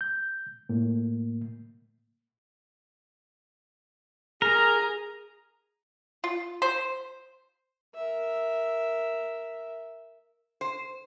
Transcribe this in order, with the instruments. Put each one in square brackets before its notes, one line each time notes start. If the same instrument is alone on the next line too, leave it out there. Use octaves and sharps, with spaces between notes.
[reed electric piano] G6
A2 A#3
[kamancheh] G#4 A#5 [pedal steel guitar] A#4
[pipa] F4
C5
[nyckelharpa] A#4 E5
[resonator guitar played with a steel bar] C5